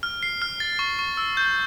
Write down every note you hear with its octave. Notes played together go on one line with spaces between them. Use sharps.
F6
C7
F6
A6
C#6
C#6
E6
G6